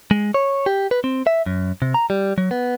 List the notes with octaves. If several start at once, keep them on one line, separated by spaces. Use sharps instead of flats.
G#3
C#5
G4
B4
C4
E5
F#2
C3
A#5
G3
F#3
B3